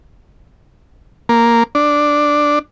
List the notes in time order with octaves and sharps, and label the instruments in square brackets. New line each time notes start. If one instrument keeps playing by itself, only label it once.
[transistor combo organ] A#3
D4